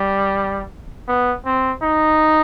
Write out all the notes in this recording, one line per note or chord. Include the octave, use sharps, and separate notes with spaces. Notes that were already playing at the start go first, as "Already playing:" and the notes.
Already playing: G3
B3
C4
D#4